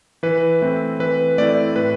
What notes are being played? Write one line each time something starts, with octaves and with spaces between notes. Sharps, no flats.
E3 B4
A3 C4 E4
E3 B4
A3 C4 E4 D5
A2 B4